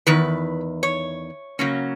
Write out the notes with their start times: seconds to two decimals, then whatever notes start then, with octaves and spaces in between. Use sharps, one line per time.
0.07 E2 D#3 B4
0.83 C#5
1.59 C#3 F#3 A#3 C#4